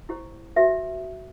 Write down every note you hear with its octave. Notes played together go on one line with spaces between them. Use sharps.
E4 G4 C5
F#4 B4 E5